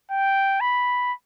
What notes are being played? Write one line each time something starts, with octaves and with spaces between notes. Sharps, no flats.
G5
B5